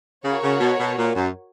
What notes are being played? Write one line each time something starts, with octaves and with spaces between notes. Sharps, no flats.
C#3 F#4 A#4 C#5
C#3
B2
B2
A#2
F#2